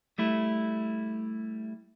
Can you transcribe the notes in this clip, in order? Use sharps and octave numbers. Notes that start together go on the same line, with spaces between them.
G3 A3 E4